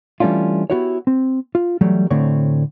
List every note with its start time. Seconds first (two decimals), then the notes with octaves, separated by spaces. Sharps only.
0.20 E3 G3 A3 C#4 D4 F4
0.70 B3 C4 E4 F#4 G4 C#5
1.07 C4
1.55 F4
1.81 E3 F#3 G3 A3
2.11 A2 D3 A3 C4 D4 C#5